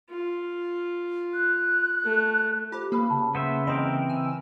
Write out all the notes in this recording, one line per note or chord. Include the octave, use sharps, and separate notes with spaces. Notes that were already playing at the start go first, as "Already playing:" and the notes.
F4
F#6
A3
F4 G4 C5
A#3 A4 B4 B5
C#3 A5
B3 C5 E5 C#6
E3 C4 A#4 D#5 E5 C6 D#6
G#5 E6